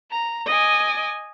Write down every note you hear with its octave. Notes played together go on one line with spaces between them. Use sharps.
A#5
D#5 G#5 D6